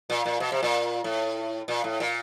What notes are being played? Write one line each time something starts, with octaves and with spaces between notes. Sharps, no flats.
A#2
A#2
B2
C3
A#2
A2
A#2
A2
A#2